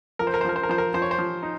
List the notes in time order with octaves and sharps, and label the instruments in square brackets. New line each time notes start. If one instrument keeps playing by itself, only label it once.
[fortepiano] F3 A#4
C5
A#4
C5
F3 A#4
C5
A#4
F3 C5
A#4
F3 C5
C#5
C5
F3
D#4